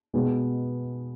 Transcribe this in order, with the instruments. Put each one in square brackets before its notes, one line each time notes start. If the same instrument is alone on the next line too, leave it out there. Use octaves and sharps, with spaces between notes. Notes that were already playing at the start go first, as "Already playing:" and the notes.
[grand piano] B2 G#3 B3